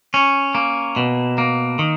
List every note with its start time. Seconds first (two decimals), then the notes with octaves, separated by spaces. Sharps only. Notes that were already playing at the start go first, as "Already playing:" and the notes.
0.14 C#4
0.55 A#3
0.96 B2
1.38 A#3
1.79 D#3